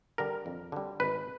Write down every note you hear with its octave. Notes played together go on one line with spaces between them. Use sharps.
D3 G3 A#4
F2
D3 G3
G#1 B4